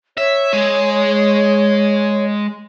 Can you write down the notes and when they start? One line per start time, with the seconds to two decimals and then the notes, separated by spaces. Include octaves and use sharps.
0.17 C#5 E5
0.53 G#3